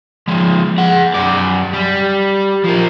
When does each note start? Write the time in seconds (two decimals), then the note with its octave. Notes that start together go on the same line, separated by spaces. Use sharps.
0.28 F3 G#3
0.78 G#4 F#5
1.14 F#2 D5
1.73 G3
2.64 F3 A#4